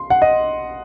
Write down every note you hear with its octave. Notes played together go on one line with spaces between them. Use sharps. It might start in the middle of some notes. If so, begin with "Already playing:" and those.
Already playing: C6
F#5
D#5